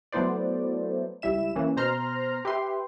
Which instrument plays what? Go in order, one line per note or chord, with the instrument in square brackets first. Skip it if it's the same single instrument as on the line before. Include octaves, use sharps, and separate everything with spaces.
[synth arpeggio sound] F#3 A3 B3 E4 C5 D5
C#2 G3 E4 E5 E7
E3 A#3 C#4
B2 C5 A#5 C6 F6
G4 B4 E5 C6